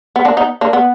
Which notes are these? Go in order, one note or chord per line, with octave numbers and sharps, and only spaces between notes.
B3
A#3 D4
B3 D#4
A#3 D4
B3